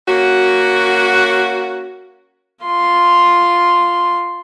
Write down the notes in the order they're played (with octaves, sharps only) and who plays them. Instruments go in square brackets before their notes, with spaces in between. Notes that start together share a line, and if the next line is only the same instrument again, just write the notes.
[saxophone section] A#3 C#4 F#4
[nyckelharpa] F4 C6